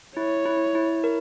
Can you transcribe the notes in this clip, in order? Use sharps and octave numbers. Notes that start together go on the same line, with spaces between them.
E4 C#5
E4
E4
A#4